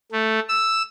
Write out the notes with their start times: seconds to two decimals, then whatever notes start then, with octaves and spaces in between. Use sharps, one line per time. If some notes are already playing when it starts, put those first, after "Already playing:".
0.12 A3
0.49 E6